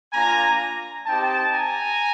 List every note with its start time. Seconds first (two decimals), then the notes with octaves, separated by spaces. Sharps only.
0.13 A#3 D4 F4 G#5 A#5
1.06 C4 D#4 G4 G5 A5
1.53 G#5 A#5